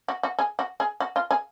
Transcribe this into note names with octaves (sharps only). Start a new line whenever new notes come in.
F#4
F#4
G#4
F#4
G#4
F#4
F4
G#4